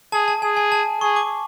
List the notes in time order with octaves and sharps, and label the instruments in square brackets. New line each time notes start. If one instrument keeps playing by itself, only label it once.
[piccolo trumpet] G#4 [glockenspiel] A5
[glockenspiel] A5
[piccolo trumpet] G#4 [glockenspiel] G#5
[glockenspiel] G#5
A5
[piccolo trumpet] G#4 [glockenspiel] C#6
[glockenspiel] D6